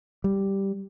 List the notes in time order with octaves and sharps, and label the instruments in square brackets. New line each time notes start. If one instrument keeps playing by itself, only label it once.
[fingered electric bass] G3